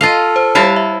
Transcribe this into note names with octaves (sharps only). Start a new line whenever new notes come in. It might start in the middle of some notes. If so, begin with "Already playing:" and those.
F4 A4 D#5 F5
C5
G3 E4 G4 C#5 F5 A5
E5